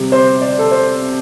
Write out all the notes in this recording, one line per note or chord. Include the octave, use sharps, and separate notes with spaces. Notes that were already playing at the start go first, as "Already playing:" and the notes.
Already playing: C3 G3
C5
D5
A4
C5